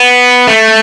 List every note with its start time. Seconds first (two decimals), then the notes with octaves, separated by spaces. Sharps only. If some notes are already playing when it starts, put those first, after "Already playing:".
Already playing: B3
0.47 A3